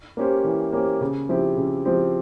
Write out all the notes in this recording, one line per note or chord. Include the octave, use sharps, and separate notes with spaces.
A#3 C#4 G4 C5
E3
A#3 C#4 G4 C5
C#3
F3 C4 E4 G4
C#3
F3 C4 E4 G4